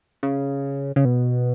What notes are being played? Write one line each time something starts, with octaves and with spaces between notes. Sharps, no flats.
C#3
C#3
B2